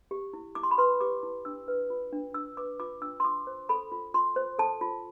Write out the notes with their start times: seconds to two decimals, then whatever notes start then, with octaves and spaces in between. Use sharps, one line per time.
0.11 G4
0.33 E4
0.55 E4 D6
0.63 C6
0.71 B5
0.78 B4 C6
1.01 G4 D6
1.23 E4
1.45 D4 E6
1.68 B4
1.90 F4
2.13 D4
2.34 D4 E6
2.57 B4 D6
2.80 F4 D6
3.02 D4 E6
3.20 C6
3.25 F4 D6
3.47 C5
3.69 A4 B5
3.92 F4
4.14 F4 C6
4.36 C5
4.59 A4 A5
4.81 F4